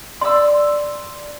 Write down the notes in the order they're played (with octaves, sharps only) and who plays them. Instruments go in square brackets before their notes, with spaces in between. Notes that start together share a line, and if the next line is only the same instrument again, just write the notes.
[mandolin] D5 E6 [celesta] C6